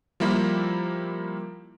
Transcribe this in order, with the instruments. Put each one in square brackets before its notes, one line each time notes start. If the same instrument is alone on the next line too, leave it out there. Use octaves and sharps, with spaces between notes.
[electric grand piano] F3 G3 A#3 E4